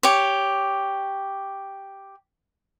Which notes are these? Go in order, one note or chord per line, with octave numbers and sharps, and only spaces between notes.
G4 C#5